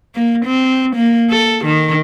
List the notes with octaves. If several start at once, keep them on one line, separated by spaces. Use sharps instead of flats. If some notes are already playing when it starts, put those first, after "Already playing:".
A#3
C4
A#3
A4
D#3